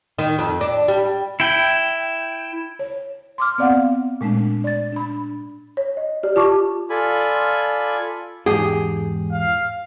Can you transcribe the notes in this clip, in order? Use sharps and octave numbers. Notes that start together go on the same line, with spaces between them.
D#3
F2
D4
G3
E4 G5
C#5
C6 D6 F6
B3 C4 D5 F5 F#5
A#2 G#3 A3 D4
D5 A6
D4 B5
C#5
D#5
G4 D5
F4 G4 A5 C#6 D6
F4 A4 D5 G#5 B5
E2 G#2 G4 G#4
F5